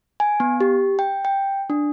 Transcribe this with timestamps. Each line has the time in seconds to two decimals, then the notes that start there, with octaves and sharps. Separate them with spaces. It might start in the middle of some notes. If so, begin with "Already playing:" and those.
0.20 G#5
0.40 B3
0.60 G4
0.99 G5
1.25 G5
1.70 D4